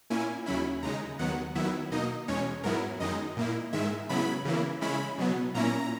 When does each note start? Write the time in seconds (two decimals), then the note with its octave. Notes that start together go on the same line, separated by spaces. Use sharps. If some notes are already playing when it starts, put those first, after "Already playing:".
0.10 A#2 A#3 C#4 E4 G#5
0.46 D#2 C#3 F#3 C#4 E4 B5
0.83 D#2 C#3 G#3 D#4 A#5
1.19 D#2 D#3 F#3 B3 F#5
1.55 D#2 D#3 F#3 B3 E4 E5
1.91 B2 A#3 D#4 D#5
2.28 E2 B2 G#3 C#4 C#5
2.63 G#2 F#3 B3 E4 A#4
3.00 F#2 D#3 G#3 D#4 D#5
3.37 A#2 A#3 E4
3.73 G#2 D#3 G#3 E5
4.09 C#3 F#3 B3 E4 B5
4.45 C#3 E3 A#3 E4
4.81 C#3 G#3 C#4 E4 B5
5.18 B2 F#3 B3
5.54 A#2 A#3 C#4 E4 A#5